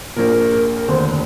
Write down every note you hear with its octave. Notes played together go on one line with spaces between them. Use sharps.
A#1 A#2 A#4
A#4
A#4
A#4
A#4
F1 D#2 D3 C5